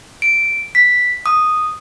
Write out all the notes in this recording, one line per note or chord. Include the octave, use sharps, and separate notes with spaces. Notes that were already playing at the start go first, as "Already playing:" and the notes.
D7
B6
D#6